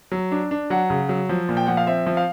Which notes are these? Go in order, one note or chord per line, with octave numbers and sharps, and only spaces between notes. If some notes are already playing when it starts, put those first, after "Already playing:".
F#3
D4
D4
F#3 F#5
C#3
F#3
F3
A#2
G5
F3 F#5
F5
C4 E5
F3
F5